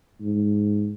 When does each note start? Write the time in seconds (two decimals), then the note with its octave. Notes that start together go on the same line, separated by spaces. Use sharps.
0.21 G#2